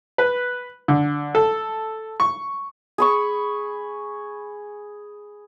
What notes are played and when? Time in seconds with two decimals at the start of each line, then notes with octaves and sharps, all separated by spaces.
0.18 B4
0.88 D3
1.35 A4
2.20 C#6
2.98 G#4 B5 C#6